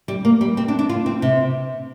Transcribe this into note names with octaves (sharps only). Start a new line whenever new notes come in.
G3
A#3
G3
C4
D4
D4
F4
C4
C3